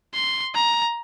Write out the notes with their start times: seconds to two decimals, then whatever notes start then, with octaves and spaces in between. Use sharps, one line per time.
0.14 C6
0.55 A#5